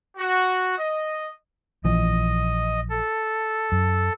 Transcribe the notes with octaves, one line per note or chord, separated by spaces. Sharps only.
F#4
D#5
A#1 E3 F3 D#5
A4
F#2